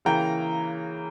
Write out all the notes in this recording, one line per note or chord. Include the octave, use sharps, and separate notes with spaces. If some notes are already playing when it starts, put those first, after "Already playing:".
C#3 E3 A#3 G5 A#5